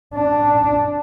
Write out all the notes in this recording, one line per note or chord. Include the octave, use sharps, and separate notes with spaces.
D4